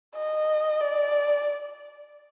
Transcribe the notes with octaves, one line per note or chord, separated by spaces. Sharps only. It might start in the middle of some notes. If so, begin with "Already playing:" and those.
D#5
D5